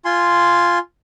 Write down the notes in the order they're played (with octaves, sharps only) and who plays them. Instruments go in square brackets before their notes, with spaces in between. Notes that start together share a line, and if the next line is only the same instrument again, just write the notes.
[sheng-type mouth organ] F4 G#5 C6